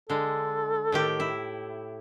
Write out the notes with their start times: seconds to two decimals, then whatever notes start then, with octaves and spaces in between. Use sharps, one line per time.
0.10 D3 G#3 A4
0.92 A2 D#3 G4
1.20 E4